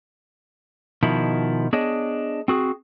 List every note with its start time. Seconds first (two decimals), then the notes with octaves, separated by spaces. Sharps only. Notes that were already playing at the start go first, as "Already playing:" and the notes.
1.03 B2 D#3 F3 E4
1.73 B3 D4 G#4 C#5 D#5
2.48 C4 F#4 G#4